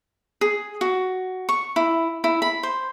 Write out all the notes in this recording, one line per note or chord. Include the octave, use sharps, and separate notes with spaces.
G#4
F#4
C#6
E4
E4
B5
C5